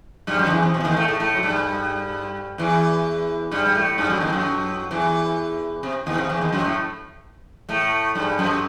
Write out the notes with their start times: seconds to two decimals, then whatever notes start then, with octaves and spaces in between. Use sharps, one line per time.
0.27 G2 G3
0.39 F#2 F#3
0.46 D#3
0.50 E2 E3
0.62 C3
0.74 B2
0.80 E3
0.85 D#2 D#3
0.96 A2 A3
1.08 A2 A3
1.20 A2 A3
1.36 F#3
1.43 G2 G3
2.58 E2 E3
3.51 G2 G3
3.66 G3
3.75 A2 A3
3.98 G2 G3
4.10 F#2 F#3
4.20 D#2 D#3
4.33 F#2 F#3
4.91 E2 E3
5.83 C3
6.06 D#2 D#3
6.18 C3
6.29 E2 E3
6.41 D#2 D#3
6.52 F#2 F#3
6.64 A2 A3
7.69 A2 A3
8.15 G2 G3
8.38 F#2 F#3